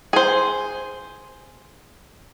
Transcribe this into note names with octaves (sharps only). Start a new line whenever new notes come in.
G#4 C5